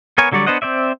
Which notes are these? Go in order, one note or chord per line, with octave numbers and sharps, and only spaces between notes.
B3 A#4 C#5 G#5
D3 F#3 G3 C#5 D5
B3 D4 C5 D#5 F#5
C4 C5 D5 E5